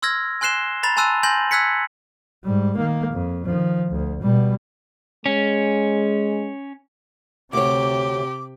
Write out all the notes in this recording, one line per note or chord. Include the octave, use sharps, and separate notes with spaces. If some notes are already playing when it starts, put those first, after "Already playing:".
C6 E6 F6 G#6 A#6
G#5 C6 F#6 C7 E7 G7
A#5 B5 A6 F7
G#5 A5 C6 E6 F#6 D#7
G#5 C6 G6 A#6 F#7
E6 F#6 G#6 B6 C#7
G#2 G3
D#3 A#3
F2
D#3 F3
D2
B2 G3
G#3 C#4
D2 C3 G4 C#5 D6